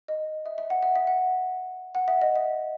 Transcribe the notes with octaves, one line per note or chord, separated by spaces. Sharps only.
D#5
E5
E5
F#5
E5
E5
F#5
F#5
E5
D#5
E5